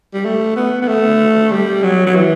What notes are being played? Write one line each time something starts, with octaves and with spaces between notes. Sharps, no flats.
G3
A3
B3
B3
A3
G3
F#3
F#3
E3